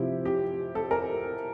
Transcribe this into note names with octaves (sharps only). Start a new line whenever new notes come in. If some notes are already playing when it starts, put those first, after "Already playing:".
Already playing: C3 F3 C4 E4 G4
G4
A4
A#4